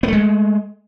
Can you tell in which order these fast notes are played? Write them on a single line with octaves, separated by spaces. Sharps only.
B3 A3 G#3